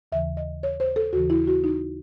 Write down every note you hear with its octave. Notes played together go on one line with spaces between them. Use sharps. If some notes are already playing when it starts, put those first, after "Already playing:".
D#2 C#3 E3 E5
D#5
C#5
C5
A4
D#2 C#3 E3 F#4
E4
F#4
D#4